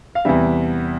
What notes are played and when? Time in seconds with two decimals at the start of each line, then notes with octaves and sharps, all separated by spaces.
0.15 F5
0.25 E2 C3 E3 G3 E5